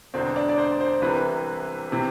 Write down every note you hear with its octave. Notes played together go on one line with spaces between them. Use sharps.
E1 E2 D3 C4
D4
D5
C5
C5
C2 C3 E3 B4
C3 E3